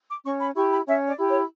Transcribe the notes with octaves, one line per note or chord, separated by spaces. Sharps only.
D6
C#4 C#6
B5
E4 G4 C#6
B5
C#4 E5
D5
E4 G4
C#5